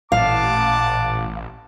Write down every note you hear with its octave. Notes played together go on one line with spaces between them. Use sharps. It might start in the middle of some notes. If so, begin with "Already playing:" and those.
A1 A#2 F5 F#5 A5 D6